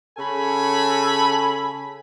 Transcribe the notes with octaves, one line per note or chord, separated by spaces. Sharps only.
C#3 A4 G#5 B5